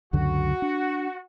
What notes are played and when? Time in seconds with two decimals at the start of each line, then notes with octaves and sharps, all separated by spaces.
0.13 C#2 F#2 D3 F#4
0.62 D4